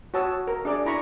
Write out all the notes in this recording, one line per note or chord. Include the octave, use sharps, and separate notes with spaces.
F#4 C#5 A5 D#6 E6
A#4 A#5
D4 G#4 D5 D6
E4 A#5 B5 C#6